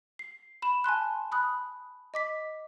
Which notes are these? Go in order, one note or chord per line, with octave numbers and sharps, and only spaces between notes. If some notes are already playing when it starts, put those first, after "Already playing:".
C7
B5 E7
G#5 A5 C6 F#6
B5 D#6 F#6
D#5 D6 B6